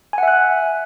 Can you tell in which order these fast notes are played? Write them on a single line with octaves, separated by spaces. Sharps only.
G#5 F#5 E5 F#6